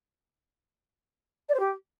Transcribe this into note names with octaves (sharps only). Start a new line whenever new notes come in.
D5
C5
G4